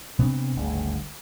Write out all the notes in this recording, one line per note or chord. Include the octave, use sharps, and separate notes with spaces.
C3 B3 C4 D4
G1 D2 G#2 C#3